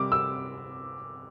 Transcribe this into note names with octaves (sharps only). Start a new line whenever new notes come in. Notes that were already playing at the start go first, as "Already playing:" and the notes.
Already playing: C3 G3 D6
E6